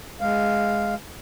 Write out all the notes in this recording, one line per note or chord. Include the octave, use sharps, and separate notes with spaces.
G#3 F5